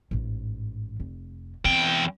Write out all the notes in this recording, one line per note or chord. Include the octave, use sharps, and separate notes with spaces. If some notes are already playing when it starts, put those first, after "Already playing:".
A1 G#2
F1
E2 C4 G5